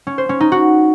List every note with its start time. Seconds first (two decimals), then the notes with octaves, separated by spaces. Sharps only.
0.07 C#4
0.18 C5
0.29 C#4
0.40 D#4
0.52 F#4